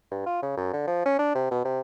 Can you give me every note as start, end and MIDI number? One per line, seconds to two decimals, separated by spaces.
0.12 0.26 43
0.26 0.39 65
0.42 0.56 49
0.57 0.70 42
0.73 0.85 50
0.87 1.03 53
1.06 1.18 61
1.19 1.32 62
1.35 1.48 48
1.51 1.61 47
1.65 1.81 48